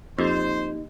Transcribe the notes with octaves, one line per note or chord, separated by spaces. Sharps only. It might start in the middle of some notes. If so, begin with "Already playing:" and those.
F2 A#3 D#4 G4 C5 D#5